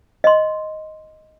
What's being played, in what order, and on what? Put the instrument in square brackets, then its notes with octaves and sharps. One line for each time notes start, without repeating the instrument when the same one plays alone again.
[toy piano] D#5 C6